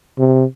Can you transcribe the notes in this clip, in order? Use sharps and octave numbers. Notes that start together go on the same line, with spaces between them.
C3